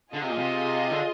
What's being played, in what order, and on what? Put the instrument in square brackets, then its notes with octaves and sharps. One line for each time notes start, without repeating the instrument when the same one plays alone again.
[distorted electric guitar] D3 [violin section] F4 G#4 D#5
[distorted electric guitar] C3
A#2
C3
D3